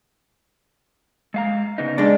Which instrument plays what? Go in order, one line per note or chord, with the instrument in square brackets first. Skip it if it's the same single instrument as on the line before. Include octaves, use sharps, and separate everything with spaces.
[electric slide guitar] G#3 F5 A#5
C#3 B3 D#4
[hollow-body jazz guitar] G#3 D4